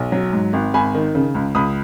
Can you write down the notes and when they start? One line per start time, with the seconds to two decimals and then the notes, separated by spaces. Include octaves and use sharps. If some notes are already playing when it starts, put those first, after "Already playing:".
Already playing: B1
0.12 F#3
0.33 G#2
0.53 G#1
0.74 G#1 G#5 B5
0.95 D#3
1.15 C#3
1.35 C#2
1.55 C#2 B5 D#6